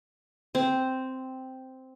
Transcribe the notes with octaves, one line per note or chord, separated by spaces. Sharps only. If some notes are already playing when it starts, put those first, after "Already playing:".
C4